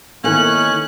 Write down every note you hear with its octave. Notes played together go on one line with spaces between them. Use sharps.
D#3 A#3 B3 C#4 E4 A4 G#5 F#6